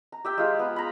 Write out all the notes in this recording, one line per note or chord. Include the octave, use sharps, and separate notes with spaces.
A#5
G4 E5 G5
G#3 F4 G#4
B3
A#5 B5